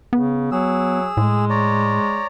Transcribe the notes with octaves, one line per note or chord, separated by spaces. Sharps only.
C#3 B3
F#3 G#4 E6
A2 G#3
C#5 D5 A#5